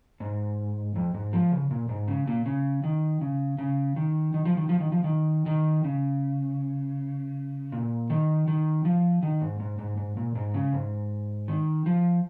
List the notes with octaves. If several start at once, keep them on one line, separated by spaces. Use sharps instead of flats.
G#2
F2
G#2
F3
C#3
A#2
G#2
C#3
A#2
C#3
D#3
C#3
C#3
D#3
D#3
F3
D#3
F3
D#3
F3
D#3
D#3
C#3
A#2
D#3
D#3
F3
D#3
G#2
G#2
G#2
G#2
A#2
G#2
C#3
G#2
D#3
F3